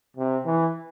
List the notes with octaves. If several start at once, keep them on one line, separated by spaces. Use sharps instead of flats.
C3
E3